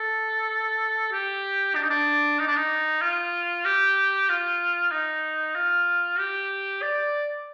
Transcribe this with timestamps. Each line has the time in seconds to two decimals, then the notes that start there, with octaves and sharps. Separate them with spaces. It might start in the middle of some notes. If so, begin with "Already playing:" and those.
Already playing: A4
1.12 G4
1.75 D4
1.82 D#4
1.90 D4
2.39 D#4
2.47 D4
2.56 D#4
3.01 F4
3.65 G4
4.29 F4
4.91 D#4
5.55 F4
6.19 G4
6.82 D5